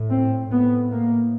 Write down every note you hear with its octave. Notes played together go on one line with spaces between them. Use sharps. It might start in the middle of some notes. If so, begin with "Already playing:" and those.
Already playing: A2
C4
A2 B3
A#3